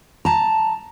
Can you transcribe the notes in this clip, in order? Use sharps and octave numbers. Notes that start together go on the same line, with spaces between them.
A5 A#5